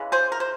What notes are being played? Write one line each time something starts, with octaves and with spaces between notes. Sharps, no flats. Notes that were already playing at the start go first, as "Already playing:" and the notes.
Already playing: C#3 E3 G#3
G#4 C5
A#4
C5